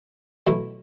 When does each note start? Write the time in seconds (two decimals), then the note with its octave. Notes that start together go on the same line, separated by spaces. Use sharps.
0.47 B2 F#3 A3 E4